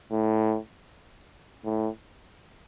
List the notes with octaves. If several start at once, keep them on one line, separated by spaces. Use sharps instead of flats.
A2
A2